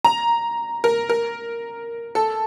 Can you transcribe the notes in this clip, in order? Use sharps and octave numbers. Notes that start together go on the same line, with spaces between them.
A#5
A#4
A#4
A4